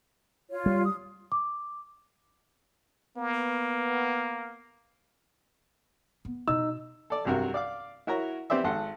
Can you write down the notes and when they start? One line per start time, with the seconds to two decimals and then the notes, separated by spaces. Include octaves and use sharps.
0.50 F4 C#5
0.66 G3
0.84 D#6
1.32 D6
3.17 A#3 B3
6.25 B3
6.48 B2 D#4 E6
7.10 A4 D5
7.25 B1 G2 C3 F#4 A#4
7.54 D5 F5 D6
8.07 E4 F#4 A#4 C#5 A#5
8.50 B3 C4 G4 C5 D5 E5
8.64 G#1 A4 F#5 C6